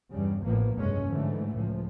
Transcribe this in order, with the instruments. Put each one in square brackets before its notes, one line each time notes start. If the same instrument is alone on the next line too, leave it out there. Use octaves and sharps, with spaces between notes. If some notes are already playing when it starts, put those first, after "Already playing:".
[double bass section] E2 G2 C#3 G3
A1 A2 F3 A#3 B3
F1 B1 G2 G#3 C#4
G#2 D3 E3 F3 A3
C#2 A2 F3